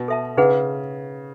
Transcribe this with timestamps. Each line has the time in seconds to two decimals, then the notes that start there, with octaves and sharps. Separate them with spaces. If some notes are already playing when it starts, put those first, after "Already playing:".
Already playing: B2
0.08 A4 E5 A5
0.37 C#3 D#4 G#4 B4 F#5